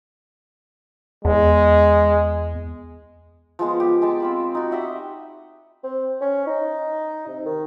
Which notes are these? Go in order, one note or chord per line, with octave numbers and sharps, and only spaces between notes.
E2 G#3
F3 G#3 B3
G4
G#3 G5 A5
C4 F4 B5
D#4 F#4
G4 D#5 E5 F#5
C4
C#4
D#4
C3
D#3